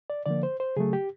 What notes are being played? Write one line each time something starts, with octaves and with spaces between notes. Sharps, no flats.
D5
D3 F3 A#3 D5
C5
C5
C#3 F#3 A3 G#4
G4